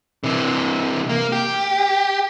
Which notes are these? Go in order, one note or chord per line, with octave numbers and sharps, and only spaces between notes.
C3 E3
A#3
G4